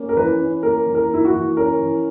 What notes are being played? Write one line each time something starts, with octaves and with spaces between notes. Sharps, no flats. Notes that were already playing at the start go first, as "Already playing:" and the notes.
Already playing: A#3 C#4
A#4
E3 B4
C#4
A#3 A#4
E3
A#4
A#3 E4
F#4
E3
C#4 A#4
E3